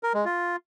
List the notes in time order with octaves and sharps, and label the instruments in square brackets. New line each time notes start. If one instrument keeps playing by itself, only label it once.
[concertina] A#4
G#3
F4